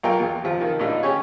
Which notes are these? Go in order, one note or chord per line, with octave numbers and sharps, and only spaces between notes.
B1 F4 A#4 G5
E2
C3 F3 F4
D#3
A2 D3 D#4 F4
C#4 G4 G#4 C#5